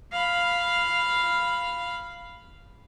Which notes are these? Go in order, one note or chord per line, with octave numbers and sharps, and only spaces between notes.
F5 B5